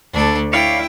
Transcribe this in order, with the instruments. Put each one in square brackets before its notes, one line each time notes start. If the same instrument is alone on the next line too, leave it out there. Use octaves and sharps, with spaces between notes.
[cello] D2 [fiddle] D4 A4
[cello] E4 [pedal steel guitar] C#5 D5 F5 [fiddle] G5